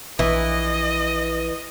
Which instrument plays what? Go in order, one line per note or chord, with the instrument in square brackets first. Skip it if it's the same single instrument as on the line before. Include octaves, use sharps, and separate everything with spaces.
[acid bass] A#1 [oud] E3 [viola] D#5